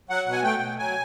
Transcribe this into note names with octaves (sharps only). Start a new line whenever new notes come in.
F#3 F#5
B2
G#5
A3 G5
B2
F#3 G#5